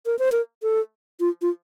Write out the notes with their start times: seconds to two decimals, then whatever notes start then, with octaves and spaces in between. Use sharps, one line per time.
0.06 A#4
0.19 C5
0.32 A#4
0.63 A4
1.20 F4
1.42 F4